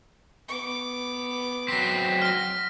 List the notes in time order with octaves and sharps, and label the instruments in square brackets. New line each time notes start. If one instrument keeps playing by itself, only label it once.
[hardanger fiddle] B3 D6
[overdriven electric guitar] F#3 C4 [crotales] A#6 B6
[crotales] F6 A#6